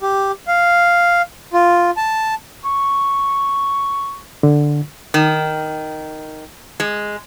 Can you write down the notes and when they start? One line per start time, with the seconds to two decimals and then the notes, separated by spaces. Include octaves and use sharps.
0.02 G4
0.47 F5
1.53 F4
1.97 A5
2.65 C#6
4.43 D3
5.14 D#3
6.80 G#3